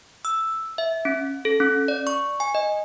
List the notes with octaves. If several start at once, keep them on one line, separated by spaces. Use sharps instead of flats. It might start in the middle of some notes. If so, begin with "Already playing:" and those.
E6
E5
C#4
A4
C#4
D5
C#6
G#5
D#5